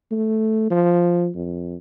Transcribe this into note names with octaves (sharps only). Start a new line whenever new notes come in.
A3
F3
F2